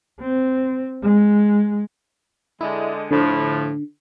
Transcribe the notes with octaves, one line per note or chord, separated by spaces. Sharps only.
C4
G#3
D3 G#3 E4
A2 D3 F3